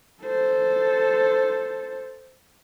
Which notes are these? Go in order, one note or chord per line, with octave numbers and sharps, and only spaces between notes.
A4 C5